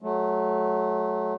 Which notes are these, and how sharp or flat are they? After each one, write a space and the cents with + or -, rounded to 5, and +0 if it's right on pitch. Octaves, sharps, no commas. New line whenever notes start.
F#3 -5 A3 -25